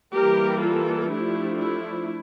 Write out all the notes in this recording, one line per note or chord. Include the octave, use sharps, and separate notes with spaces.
E3 G3 A#3 G4 A#4
F4 A4
F3 A3 D4 E4 G4
E4